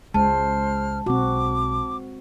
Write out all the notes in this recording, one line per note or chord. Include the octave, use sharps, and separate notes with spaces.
C#2 G#3 C#4 C5 A5 F6
B1 C4 F#4 D6